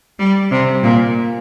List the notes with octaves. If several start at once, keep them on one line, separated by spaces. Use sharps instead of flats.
G3
C3
A#2